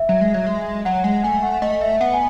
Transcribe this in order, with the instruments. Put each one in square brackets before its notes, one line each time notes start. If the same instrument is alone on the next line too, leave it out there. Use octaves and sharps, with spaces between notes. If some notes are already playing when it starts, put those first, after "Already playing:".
Already playing: [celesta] E5
[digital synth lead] F#3
G#3
F#3
G#3
[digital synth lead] F#3 [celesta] F#5
[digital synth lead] G#3
[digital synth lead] A3 [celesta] G#5
[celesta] F#5
[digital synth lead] A3 [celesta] D#5
[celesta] E5
[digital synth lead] B3 [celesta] F#5
[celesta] G#5